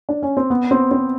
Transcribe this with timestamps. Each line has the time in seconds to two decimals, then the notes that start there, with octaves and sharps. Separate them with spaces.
0.09 D4
0.22 C#4
0.37 C4
0.50 B3
0.71 C4
0.91 C4